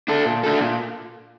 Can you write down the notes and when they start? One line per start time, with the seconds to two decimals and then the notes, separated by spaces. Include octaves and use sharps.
0.08 A3 D4 A4
0.26 A#2
0.44 A3 D4 A4
0.61 A#2